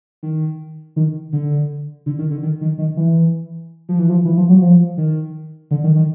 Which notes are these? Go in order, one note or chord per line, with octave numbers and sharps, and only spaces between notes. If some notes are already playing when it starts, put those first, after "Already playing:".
D#3
D#3
D3
D3
D#3
D3
D#3
D#3
D#3
E3
F3
E3
F3
E3
F3
F#3
F3
D#3
D3
D#3
D#3